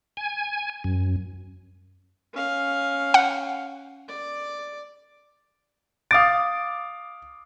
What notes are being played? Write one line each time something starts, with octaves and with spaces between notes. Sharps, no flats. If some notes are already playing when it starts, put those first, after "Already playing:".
G#5
F#2
C#4 F5
F#5
D5
F5 D6 D#6 A6 D7